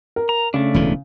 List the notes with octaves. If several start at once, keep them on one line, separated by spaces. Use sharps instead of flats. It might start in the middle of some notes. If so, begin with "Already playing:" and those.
A#4
A#5
C#3 A3 D4
E1 D2 E3